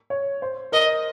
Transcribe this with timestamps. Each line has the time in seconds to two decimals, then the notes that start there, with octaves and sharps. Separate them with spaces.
0.10 C#5
0.42 C5
0.72 A#4 D#5